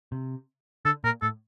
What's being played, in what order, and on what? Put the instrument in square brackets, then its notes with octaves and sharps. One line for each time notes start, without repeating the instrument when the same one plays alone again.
[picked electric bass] C3
[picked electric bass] D3 [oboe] A4
[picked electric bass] A#2 [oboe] A#4
[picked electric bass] A2 [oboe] A4